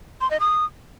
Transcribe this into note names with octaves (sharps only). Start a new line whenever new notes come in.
C6
D#5
D#6